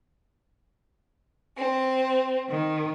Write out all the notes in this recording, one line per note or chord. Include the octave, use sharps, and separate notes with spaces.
C4
D#3